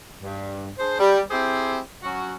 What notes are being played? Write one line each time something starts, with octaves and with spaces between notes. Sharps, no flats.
G2
D4 G#4 C5
G3
C4 E4 G4 G#4 C5
F#3 C#4 F#4